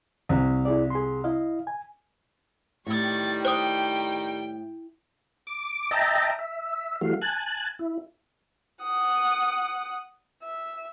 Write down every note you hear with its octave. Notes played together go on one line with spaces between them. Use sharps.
C2
E4 G#4 D5
G#4 C6
E4 D#5 F5
G#5
A2 D#3 G3 C#6 A6
C5 G5 D#6
D6
D#5 E5 G5 A5 A#5
E5
E3 G3 A3 F#4 F5
G#5 A5 F#6
E4
F#5 D#6
E5